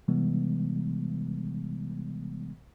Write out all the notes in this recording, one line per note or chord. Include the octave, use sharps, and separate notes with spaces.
C3 E3 G3 G#3 B3